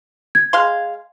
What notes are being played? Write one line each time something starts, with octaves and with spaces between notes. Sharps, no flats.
G#6
G#3 F5 C6